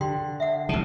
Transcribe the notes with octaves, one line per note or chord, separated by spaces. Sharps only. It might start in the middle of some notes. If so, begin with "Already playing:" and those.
D3 G4 G5 C6
E5 F#5
A1 C3 A5